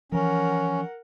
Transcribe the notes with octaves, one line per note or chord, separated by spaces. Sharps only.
E3 F3 C#4 A#4 F#5